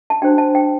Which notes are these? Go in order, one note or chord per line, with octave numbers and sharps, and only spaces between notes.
A5
D4 F#4 C5 G5
A5
G5